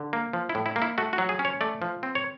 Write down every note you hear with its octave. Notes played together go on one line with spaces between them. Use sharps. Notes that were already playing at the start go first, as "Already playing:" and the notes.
Already playing: D3
A#3
F3
E4
A2
E4
A#3
E4
A3 F#4
F#4
F#3
G#4
C#4
C#5
A3 D5
F3
C4
C#5